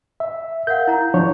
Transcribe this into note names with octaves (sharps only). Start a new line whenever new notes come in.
E5
A#4 F5 F#5 G6
E4 A#5
F3 D4 C#5